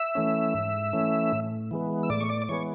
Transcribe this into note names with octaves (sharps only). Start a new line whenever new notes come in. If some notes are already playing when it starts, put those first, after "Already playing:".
Already playing: E5 E6
E3 A3 C#4
G#2
E3 A3 C#4
A2
E3 G#3 B3
E6
A2 D5 D6
C#6
D5 D6
D6
E3 G#3 B3 C#5 C#6